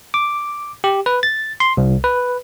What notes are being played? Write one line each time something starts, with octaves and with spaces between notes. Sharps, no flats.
D6
G4
B4
A6
C6
C2
B4